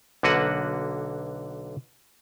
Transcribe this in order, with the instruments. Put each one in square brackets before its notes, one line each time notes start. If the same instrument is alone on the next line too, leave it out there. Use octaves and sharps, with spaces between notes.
[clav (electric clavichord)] B1 D3 A#3 F#4 B4 F#5